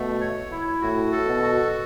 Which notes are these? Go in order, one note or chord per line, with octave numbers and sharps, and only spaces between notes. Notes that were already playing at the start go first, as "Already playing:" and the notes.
Already playing: B2 A3
C#5
E4
A2 F#4
A4
B2
F#4